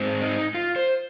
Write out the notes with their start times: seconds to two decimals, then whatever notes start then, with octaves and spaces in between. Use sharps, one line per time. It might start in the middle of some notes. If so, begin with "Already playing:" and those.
Already playing: G#2 G#3 C4
0.22 D#4
0.54 F4
0.76 C5